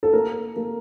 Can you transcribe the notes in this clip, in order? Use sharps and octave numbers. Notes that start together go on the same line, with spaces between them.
A4
A#3 A#4
A#3